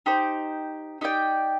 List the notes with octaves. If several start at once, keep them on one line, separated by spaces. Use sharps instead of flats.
D#4 G4 C5
D#4 G4 D5 G5